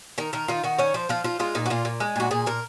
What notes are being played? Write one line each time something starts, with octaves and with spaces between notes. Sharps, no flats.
D#3 A#4
D#3 A#4
D#3 F4
D#3 F#4
C#4 C#5
F3 C5
F3 F4
F3 F4
G#3 F4
A#2 D#4
F#4
A#2 F4
A#2
G#3
A#2 F#4
A#2 G#4
A#2 A#4